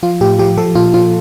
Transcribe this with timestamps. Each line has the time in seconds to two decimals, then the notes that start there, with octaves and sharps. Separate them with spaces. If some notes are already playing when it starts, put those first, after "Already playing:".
0.03 F3 F4
0.21 A2 G4
0.39 F3 G4
0.57 F3 A4
0.75 A#2 F4
0.94 F3 F4